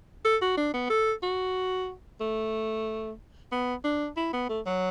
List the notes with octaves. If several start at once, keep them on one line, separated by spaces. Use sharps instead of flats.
A4
F#4
D4
B3
A4
F#4
A3
B3
D4
E4
B3
A3
F#3